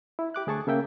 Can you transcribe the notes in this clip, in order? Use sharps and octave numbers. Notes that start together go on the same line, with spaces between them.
E4
G4 D6 F#6
D2 G#4 A5 C#6
C#3 A#3 E5 G5